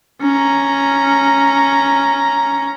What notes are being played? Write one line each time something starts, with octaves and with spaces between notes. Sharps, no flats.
C#4 A#5